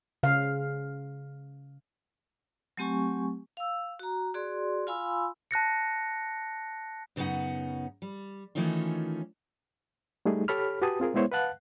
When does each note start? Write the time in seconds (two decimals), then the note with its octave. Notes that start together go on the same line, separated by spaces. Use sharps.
0.23 C#3 F5
2.77 F#3 A3 C4 G4 G#5 C#6
3.57 F5 E6
3.99 F#4 A#5
4.34 F#4 G#4 D5 C6
4.87 F4 F5 G#5 B5 C6 E6
5.51 A5 F#6 A#6 C#7
7.16 F#2 C#3 B3 D#4 F#5
8.02 G3
8.55 D#3 E3 A3 C#4 D#4 F4
10.25 G3 A3 D#4 G#4
10.48 G4 A4 C#5 B5 F6
10.82 F#4 G4 B4 G#5 A5 D#6
11.00 C4 F4 G#4 A#4
11.14 G#3 B3 E4 C5 C#5
11.32 B4 F5 F#5 A5 F#6